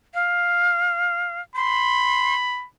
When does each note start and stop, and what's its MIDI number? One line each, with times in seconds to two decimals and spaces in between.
0.14 1.41 77
1.56 2.66 83
1.56 2.35 84